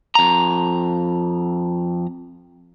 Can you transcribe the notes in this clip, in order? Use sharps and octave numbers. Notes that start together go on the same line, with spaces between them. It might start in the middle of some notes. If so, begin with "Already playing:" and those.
F2 A#5